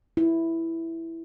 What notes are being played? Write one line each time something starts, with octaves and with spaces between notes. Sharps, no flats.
E4